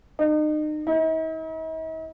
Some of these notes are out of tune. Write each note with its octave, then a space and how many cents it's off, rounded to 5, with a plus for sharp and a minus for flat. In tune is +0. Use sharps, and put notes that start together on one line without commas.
D#4 -35
D#4 +45